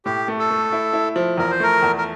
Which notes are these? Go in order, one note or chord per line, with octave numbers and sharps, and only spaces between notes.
A2 G4
A3
A4
A3
E4
E4
F3
E2 A#4
C5
A3 A#4
E2
A#4